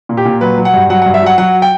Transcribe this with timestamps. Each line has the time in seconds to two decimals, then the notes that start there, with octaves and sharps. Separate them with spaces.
0.09 A#2
0.17 G4
0.25 A#2
0.41 F#3 B4
0.58 F#3
0.65 F#5
0.74 G2
0.90 F#3 F#5
1.02 F#5
1.06 G2
1.14 E5
1.22 F#3 F#5
1.38 F#3 F#5
1.62 G5